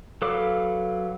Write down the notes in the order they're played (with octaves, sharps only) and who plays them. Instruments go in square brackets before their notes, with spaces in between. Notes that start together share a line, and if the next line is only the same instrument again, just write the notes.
[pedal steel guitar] F#3 A4 B4 F5 D6